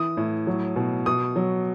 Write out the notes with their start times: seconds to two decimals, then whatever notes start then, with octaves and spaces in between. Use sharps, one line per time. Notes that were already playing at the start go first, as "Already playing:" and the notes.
Already playing: E3 D#6
0.17 A2
0.47 F#3
0.76 B2
1.06 B2 D#6
1.36 F#3